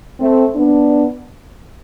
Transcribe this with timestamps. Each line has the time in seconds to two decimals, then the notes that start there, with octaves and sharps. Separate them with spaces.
0.20 A3 C4
0.55 B3 D4